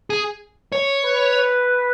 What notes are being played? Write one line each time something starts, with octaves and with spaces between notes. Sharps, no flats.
G#4
C#5
B4